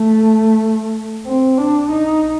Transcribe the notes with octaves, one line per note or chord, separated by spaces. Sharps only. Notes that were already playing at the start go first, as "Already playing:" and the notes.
Already playing: A3
C4
D4
D#4